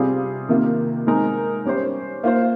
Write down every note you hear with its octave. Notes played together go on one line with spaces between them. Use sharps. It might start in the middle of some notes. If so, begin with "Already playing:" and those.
Already playing: C3 G3 C4 F4 G#4
C3 D#3 A#3 F4
G#3 C4 D#4 A#4
G3 C#4 G4 C5
A#3 F4 C5